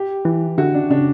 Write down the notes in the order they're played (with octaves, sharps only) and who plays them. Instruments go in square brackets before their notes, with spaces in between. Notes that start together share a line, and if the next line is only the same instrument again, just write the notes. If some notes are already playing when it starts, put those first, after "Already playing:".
Already playing: [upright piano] G4
[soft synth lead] E3
[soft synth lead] D3 [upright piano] F#4
[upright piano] D4
[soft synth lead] C#3 [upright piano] D4